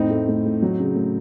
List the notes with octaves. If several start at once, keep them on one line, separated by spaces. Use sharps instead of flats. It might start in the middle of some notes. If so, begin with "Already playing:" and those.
Already playing: F2 A2 C4 D#4
A3
A3
A2
F#3
C#3
A3